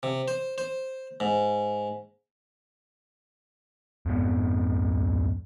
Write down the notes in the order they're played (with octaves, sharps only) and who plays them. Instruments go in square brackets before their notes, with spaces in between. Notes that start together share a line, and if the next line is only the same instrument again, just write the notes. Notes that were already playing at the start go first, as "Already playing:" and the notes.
[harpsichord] C3
C5
C5
G#2
[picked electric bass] F2 G#2 B3